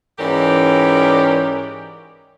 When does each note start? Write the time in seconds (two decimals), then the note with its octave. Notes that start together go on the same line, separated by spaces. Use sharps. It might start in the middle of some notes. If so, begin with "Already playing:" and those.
0.19 G#2 E3 C#4 G4 A#4 D5